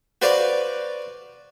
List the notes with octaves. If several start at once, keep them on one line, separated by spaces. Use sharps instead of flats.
F#4 B4 C5 D5 F5